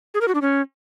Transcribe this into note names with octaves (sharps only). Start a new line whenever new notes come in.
G#4
A#4
F#4
D4
C#4